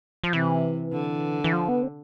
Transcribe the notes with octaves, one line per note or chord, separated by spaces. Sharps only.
F3
C3 E3
D3
E3
F3
B3
C4